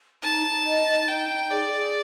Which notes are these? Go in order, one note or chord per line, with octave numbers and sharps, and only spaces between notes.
D#4 A5
D#4
D#5
D#4
D#4 G5
D#4
G#4 D5
G#4